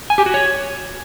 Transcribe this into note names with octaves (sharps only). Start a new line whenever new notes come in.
G#5
G4
F#4
C#5